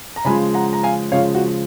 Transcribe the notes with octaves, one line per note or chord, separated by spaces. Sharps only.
A#5
C#3 F3 G#3 G#5 B5
F#5 A#5
A#5
F5 G#5
C#3 F3 G#3 C#5 F5
F#4